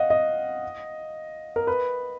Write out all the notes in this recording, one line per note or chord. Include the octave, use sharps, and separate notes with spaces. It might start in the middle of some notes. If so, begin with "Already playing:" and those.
Already playing: D#5 F5 F#5
D#5
A#4
B4